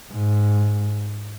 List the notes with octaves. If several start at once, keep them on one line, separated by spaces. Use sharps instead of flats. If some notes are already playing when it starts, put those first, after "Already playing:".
G#2